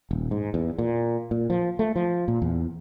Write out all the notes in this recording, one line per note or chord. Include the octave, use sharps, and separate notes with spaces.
D#1
G#2
E2
A#2
A#2
F3
A3
F3
A#2
E2